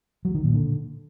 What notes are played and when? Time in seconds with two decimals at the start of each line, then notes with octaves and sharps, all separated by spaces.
0.25 F#3
0.35 D#3
0.44 A#2
0.54 D3